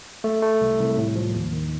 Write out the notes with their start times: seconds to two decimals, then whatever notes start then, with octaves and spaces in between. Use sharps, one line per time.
0.24 A3
0.42 A3
0.61 C2
0.79 C2
0.97 A2
1.15 F3
1.35 D#2
1.53 D#3